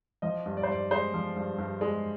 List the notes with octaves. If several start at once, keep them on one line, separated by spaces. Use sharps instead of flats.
F3 D#5
G2
D5
C5
G2 D5
G#3 C5
F3
G2
G2
G#3